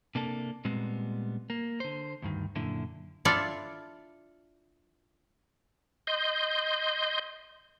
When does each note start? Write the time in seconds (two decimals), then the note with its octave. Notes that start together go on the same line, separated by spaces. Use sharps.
0.15 C3 A#3 D4 A4
0.65 A#2 G3 G#3 B3 C4
1.50 A#3
1.80 D3 C5
2.22 D2 G2 D#3
2.56 F#2 A#2 D3 E4
3.25 D4 E4 F4 A4 D5 F5
6.07 D#5 C6 G6